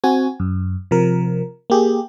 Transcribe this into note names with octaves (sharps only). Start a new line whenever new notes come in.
C4 F#4 G#5
F#2
C3 F3 A#4
A#3 G4 G#4